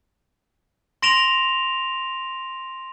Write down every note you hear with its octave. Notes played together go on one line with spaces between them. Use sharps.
C6 A#6 D7 E7 F7 G7